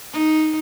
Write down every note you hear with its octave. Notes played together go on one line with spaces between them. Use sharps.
D#4